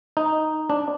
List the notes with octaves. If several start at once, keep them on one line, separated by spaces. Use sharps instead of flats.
D#4
D4